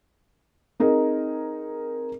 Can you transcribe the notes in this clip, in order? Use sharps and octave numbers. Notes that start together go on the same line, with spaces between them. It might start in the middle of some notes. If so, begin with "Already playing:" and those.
C4 D#4 G#4 A#4